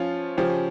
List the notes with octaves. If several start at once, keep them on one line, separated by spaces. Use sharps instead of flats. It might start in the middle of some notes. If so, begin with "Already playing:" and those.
Already playing: F3 C#4 F4
C#3 F3 C#4 G4